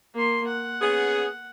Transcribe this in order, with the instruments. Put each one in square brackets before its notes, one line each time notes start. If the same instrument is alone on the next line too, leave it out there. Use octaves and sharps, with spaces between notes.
[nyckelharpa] A#3 C6
F#5
[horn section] B3 C#4 G#4